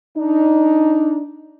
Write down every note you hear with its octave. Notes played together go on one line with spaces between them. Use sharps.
D4 D#4